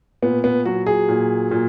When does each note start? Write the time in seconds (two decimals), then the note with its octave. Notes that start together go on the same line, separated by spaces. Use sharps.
0.23 A#2 B3
0.44 B3
0.65 F#3 F#4
0.86 G#4
1.09 A#2
1.51 A#2